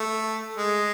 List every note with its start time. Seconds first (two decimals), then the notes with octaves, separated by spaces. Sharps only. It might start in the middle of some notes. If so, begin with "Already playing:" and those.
Already playing: A3
0.57 G#3